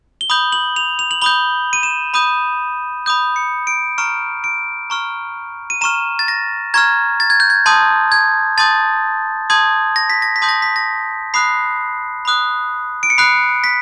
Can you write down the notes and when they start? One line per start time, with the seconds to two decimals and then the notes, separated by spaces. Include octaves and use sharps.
0.21 G7
0.30 B5 D#6 G6 F#7
0.52 F#7
0.76 F7
0.99 F7
1.11 F#7
1.22 B5 D#6 G6 G7
1.73 D#7
1.83 E7
2.14 B5 D#6 G6 D#7
3.06 B5 D#6 G6
3.36 C#7
3.67 D7
3.98 A#5 C#6 F6 D7
4.44 D7
4.90 A#5 C#6 F6
5.70 D#7
5.81 A#5 C#6 F6 E7
6.19 A6
6.28 A#6
6.74 A#5 C#6 F6 G#6
7.20 A6
7.30 G#6
7.40 G6
7.50 G#6
7.66 A5 C6 D#6 G6
8.12 G#6
8.58 A5 C6 D#6 G6 A6
9.50 A5 C6 D#6 G6 G#6
9.96 A#6
10.10 B6
10.22 A#6
10.36 B6
10.42 A5 C6 D#6 G6
10.49 A#6
10.62 B6
10.76 A#6
11.34 B5 D#6 F#6 C7
12.25 B5 D#6 F#6
13.03 D7
13.10 C#7
13.18 B5 D#6 F#6 C7
13.64 B6